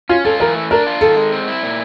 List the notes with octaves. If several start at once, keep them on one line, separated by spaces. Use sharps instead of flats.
C#4 F4
F4 A4
E3 A#4
A3
D4 A#4
F4
D#3 A4
G#3
C4
E4
A#2